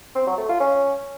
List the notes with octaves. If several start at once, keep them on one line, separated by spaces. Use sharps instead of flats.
C4
F#3
A3
F4
C#4